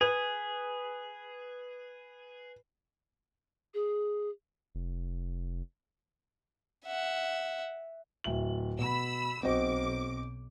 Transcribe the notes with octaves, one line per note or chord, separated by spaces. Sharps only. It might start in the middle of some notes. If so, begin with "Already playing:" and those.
G#4 B4
G#4
F1
E5 F#5
D1 E5 F#7
B2 B5 E6
B1 C4 F#4 D#5 D6